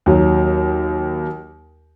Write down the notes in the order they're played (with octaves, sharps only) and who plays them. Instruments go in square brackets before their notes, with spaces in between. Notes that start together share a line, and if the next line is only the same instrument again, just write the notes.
[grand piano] D#2 F#3